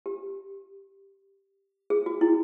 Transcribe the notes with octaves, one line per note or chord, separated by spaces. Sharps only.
G4
G#4
F#4
E4